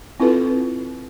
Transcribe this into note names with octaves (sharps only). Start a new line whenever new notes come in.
C4 E4 F4 A4 B4